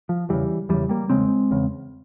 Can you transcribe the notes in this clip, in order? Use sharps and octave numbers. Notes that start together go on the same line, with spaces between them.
F3
E2 C#3 E3 G3
E2 C#3 E3 G3
G3 A#3
E2 C#3 G#3 C4
E2 C#3